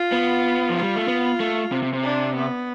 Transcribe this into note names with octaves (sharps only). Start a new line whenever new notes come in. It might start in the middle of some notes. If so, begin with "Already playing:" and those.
Already playing: F4
B3
F3
F4
G3
A3
B3
A3
C3
C3
C3
D4
B3